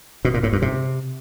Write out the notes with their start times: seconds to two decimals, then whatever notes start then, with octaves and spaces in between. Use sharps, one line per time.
0.25 B2
0.34 A#2
0.43 A2
0.53 G2
0.62 C3